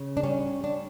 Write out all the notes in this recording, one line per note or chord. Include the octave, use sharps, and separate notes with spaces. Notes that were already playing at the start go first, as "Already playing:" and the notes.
Already playing: C#3
D4
G3 C#4
G3 D4